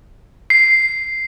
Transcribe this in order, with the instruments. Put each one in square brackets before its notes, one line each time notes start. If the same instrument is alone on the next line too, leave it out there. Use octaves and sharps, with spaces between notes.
[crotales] C7